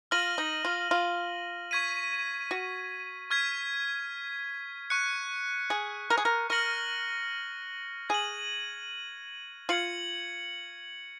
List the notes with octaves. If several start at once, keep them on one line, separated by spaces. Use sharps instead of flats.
F4 F6 A#6 D#7 F#7
D#4
F4
F4
C#6 G#6 B6 D#7
F#4
C#6 F6 G#6 B6
C#6 F#6 C#7
G#4
A#4
G#4
A#4
A#4 C#6 F6 A#6 C#7 F#7
G#4 G#6 D#7 F#7
F4 G#6 C#7 F#7